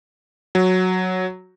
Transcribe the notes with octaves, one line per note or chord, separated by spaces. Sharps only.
F#3